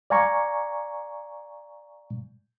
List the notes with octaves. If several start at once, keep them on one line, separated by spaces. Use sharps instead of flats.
D5 F5 G#5 A#5 C#6